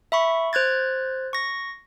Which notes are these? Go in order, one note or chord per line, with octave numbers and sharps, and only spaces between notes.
E5 B5 C#6
C5 F#6 G#6 A6
C#6 A#6